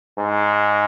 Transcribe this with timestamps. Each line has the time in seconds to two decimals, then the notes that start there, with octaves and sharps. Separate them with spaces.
0.18 G#2